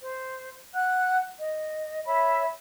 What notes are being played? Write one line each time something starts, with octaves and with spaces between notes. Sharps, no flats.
C5
F#5 F#6
D#5
C#5 E5 B5